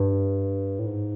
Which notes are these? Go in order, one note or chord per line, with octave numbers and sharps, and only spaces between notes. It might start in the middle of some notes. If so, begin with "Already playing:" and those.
Already playing: G2
A2
G#2